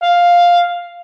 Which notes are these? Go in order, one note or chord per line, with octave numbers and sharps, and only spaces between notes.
F5